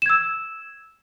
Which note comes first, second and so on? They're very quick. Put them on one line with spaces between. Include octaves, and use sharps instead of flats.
E7 G#6 E6